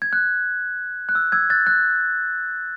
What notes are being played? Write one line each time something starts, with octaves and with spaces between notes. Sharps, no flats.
G#6
F#6
F#6
E6
E6 G#6
F#6 A6
F#6 A6